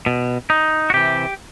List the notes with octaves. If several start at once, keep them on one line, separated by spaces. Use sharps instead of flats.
B2
D#4
F#4
C3 E3 G4